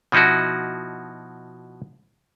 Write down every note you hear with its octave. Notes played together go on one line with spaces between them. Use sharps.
B2 F3 D#4 E4 F#4